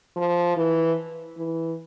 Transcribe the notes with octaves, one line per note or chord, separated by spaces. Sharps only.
F3
E3
E3